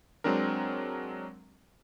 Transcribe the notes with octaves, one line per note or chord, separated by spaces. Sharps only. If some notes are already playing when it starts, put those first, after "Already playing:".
F#3 G#3 C4 D4 A#4